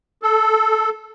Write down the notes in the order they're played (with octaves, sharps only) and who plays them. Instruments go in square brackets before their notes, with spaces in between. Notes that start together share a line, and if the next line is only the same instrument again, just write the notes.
[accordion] A4